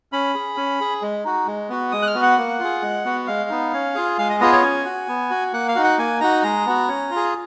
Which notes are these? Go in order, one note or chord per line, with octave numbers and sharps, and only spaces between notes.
C#4 B5
G#4
C#4
G#4
G#3
D#4 F#4
G#3
B3 F#4
G#3 D#6
F#6
F6
B3 F#4
F#5
A#3
F4 G#4
G#3
B3 F#4
G#3 F5
B3 D#4
C#4
F4 G#4
G#3 F5
D#5
B3 F4 G#4 D#5
C#5
C#4 G#5
F#4
B3
F#4
A#3 F#5
F5
D#4 F#4
F#5
A#3 G#5
D#4 F#4 A#5
G#3 A#5
B3 F#4
C#4
F4
G#4